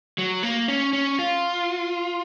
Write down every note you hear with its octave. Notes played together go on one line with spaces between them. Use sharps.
F#3
A#3
C#4
C#4
F4